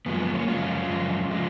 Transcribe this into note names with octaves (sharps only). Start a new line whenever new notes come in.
F#2 F3 G#3 B3
B3
A#3 C#4
F#2 F3 G#3 C#4 F4
F#2 F3 G#3
F3 G#3